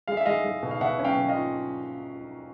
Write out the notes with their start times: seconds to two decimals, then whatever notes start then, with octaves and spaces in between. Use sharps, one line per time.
0.08 G#3 F5
0.17 E5
0.25 G#3 D#5 F5
0.44 G#3
0.63 B2
0.71 F5
0.81 B2 E5 F#5
0.99 C#4
1.04 F5 G5
1.17 B2
1.28 D#5 F5
1.35 F4